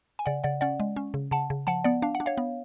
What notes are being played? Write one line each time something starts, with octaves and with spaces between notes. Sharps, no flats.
G#5
C#3 D5 F#5
C#3 D5 F#5
C#4 D5 F#5
G#3
C#4
C#3
C#3 F#5 A5
C#3
F3 F#5 A5
B3 D5 F#5
D4 F5
F#5
D4
C#5 F5
B3